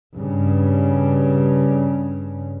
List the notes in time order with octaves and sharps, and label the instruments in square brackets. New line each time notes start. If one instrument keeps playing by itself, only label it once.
[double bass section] G2 C#3